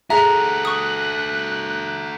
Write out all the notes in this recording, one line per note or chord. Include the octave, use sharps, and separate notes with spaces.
F#4 G#4 A4 E5 A#5 F#6
C#6 D#6